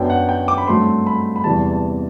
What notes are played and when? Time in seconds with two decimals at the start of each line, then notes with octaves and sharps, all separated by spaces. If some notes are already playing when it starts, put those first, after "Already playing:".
Already playing: F#2 F#3 B3 D4 G5
0.10 F#5
0.29 G5
0.48 D6
0.58 B5
0.67 G2 F#3 A3 C4 C6
1.07 B5
1.36 B5
1.44 E2 C3 E3 G3 A5
1.71 A5